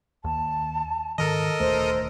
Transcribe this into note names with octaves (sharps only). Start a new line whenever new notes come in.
D#2 A5
G#2 D#3 A4 A#4 D#5
D#1 D2 A3 C5